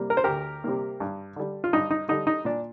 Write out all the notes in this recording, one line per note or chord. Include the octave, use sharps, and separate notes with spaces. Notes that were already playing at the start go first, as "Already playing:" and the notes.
Already playing: C3 G3 A#3
A#4
C5
D2 G4 A#4
C3 G3 A#3
G2
D3 G3
F4
G2 D#4
D#4
D3 G3 D#4
D#4
A#2 D4